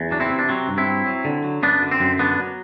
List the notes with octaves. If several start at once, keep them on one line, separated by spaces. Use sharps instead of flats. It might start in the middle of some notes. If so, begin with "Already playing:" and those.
Already playing: E2
F#3 D4
C4 E4
C3
D4
F#3 C4
G2
C4 E4
F#3
F#3
D3
F#3
F#2 B3 D4
D3
C4
F#2
D3 B3 D4
F#3